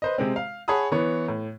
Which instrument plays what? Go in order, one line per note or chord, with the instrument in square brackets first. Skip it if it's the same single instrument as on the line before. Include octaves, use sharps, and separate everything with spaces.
[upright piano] B4 C5 D#5
C3 G#3 C4
F5
G#4 C#5 F#5 A5 B5 D#6
E3 B3 C#5
A2